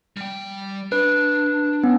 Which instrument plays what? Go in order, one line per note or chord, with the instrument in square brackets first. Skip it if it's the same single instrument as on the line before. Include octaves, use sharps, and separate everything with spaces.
[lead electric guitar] G3 G5
[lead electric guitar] D4 [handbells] B4
[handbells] B3 C#4